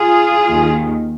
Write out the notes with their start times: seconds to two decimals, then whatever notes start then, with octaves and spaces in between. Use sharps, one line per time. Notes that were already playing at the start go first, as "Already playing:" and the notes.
Already playing: F4 G#4
0.48 D#2 D#3